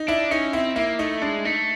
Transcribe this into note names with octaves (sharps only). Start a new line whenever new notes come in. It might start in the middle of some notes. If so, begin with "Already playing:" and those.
Already playing: D#4
D4 E4
C#4 D#4
C4 E4
A#3 E4
A3 D#4
G#3 D4
A3 D#4